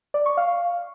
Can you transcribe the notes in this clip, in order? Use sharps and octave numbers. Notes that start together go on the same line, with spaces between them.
D5
C#6
F5